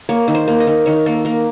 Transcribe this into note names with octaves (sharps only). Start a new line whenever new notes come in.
A#3 C#5
D#3
C5
A#3
D#5
D#3
D#3 C#5
A#3 A4
A#3 A#4